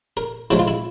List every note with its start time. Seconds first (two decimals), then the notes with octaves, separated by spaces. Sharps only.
0.17 A#4
0.51 C#3 F3 G#3 E4
0.59 F4
0.68 E4